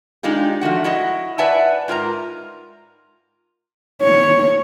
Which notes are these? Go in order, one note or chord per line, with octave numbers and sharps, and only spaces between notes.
G#3 D4 D#4 F4 G4
F3 A3 F#4 F#5
E4 F#4 D#5 F#5
B4 D5 E5 F#5 G#5 A5
G#2 F4 A#4 G#5 A#5
C#5